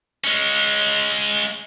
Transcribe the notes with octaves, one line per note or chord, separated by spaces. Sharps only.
G#3 C#4